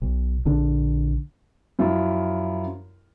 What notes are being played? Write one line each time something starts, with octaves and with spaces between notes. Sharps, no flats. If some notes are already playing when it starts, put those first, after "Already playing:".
B1
A#1 D3 D4
F#2 F3 E4 F4